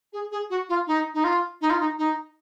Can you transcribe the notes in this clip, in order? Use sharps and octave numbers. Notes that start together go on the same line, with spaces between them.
G#4
G#4
F#4
F4
D#4
D#4
F4
D#4
F4
D#4
D#4